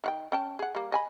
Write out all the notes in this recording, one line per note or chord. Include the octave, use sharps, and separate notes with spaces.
D#3 F#5 G5
C#4 G5 A5
G#4 F#5
G3 A#3
D#5 G#5 B5